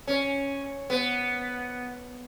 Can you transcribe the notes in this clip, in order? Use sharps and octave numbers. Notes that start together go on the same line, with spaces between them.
C#4
B3